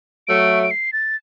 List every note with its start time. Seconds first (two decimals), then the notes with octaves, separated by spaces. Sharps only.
0.27 F#3 A3 D7
0.63 D7
0.71 C7
0.93 A6